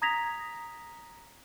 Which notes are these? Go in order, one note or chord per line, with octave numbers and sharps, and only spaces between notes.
A#5 D#6 G#6 A#6 B6 F7